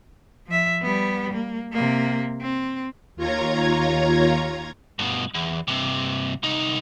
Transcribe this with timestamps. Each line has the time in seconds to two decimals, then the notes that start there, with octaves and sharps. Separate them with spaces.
0.47 F3 E5
0.82 G3 B3
1.33 A#3
1.73 C3 A#3
2.41 C4
3.16 D#2 F4 C#5 A#5 G#6
4.99 G2 B2
5.34 E2
5.68 G2 C3
6.43 C2 D#4